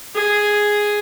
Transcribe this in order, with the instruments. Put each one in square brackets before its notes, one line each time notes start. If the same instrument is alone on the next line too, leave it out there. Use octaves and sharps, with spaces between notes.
[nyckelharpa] G#4